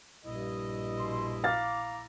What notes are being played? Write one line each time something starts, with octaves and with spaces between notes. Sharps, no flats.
A#1 G2 E4 D#5
B2 C6
F5 A#5 D6 F6 A6